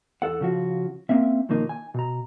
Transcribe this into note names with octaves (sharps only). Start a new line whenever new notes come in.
E2 A4 F#5
C#3 F3 F#4
A#3 C4 C#4 E5
B1 D#3 F3 A#3 D#4
G#5
B2 A#5